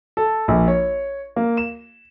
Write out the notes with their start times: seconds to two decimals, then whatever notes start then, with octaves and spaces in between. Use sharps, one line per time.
0.17 A4
0.48 A#1
0.68 C#5
1.36 A#3
1.57 E7